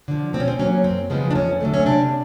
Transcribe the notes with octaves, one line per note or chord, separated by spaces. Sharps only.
D3 F3
B2 C4
C#4
C4
F#3 A#3 C#4
F#2 C4
C#3 F3 G#3 B3
D4
F2 C#4
D3 F#3 A3
C#4
C3 D4